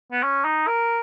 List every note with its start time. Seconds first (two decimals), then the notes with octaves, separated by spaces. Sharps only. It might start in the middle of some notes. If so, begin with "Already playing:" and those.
0.12 B3
0.23 C#4
0.45 D#4
0.67 A#4